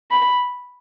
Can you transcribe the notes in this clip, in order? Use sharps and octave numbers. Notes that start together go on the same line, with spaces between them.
B5